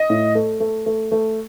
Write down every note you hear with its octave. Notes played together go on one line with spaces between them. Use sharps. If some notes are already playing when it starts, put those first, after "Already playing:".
Already playing: D#5
A2
A3
A3
A3
A3